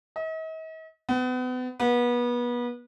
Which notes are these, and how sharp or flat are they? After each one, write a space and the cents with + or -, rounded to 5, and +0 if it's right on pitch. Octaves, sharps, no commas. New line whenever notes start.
D#5 +45
B3 +35
B3 -30